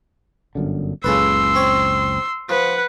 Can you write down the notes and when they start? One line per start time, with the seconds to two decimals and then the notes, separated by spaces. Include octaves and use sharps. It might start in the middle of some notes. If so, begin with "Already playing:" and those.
0.55 G1 F#2 D3
1.04 F#1 C#2 C#3 A4 B4 C6 E6
1.55 C4 C#5
2.49 F3 B4 F#5